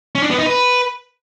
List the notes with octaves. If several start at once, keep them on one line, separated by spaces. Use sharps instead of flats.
C#4
D4
B3
D#4
B4